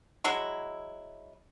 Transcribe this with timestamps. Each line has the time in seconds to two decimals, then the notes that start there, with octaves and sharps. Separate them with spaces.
0.24 F#3 G#3 E4